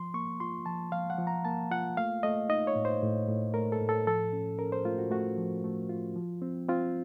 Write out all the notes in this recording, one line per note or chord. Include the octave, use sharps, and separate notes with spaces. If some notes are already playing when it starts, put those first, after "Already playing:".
Already playing: F3 C6
A#3 C#6
F4 C6
F3 A5
F3 F5
F#5
F3
A#5
A#3 A5
F4 F#5
A3 F5
A3 D#5
D#4 D#5
C#5
A2
C5
A2
A2
A3 A#4
A4
A2
A4
F3 A4
C#4
C#4 A#4
C5
A3 F4
F#4
A3 F#4
F3
A3
F4
F3
C4
C4 F4